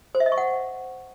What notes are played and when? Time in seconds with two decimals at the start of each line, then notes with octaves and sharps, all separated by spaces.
0.15 C5
0.20 E5
0.26 D#5
0.32 C#6
0.38 F#5